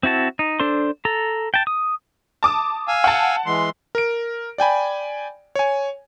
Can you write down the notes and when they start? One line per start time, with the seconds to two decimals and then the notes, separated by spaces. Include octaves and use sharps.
0.03 C4 E4 F#4 A5
0.39 D#4
0.60 D4 A4 C5 C6
1.05 A4 A#5
1.54 G5 A5
1.67 D#6
2.43 A5 D6 D#6
2.88 F5 G#5 E6
3.04 F#5 A5
3.46 E3 G#3 C6
3.95 A#4 D7
4.58 D5 G5 G#5 B5
5.55 C#5 G#5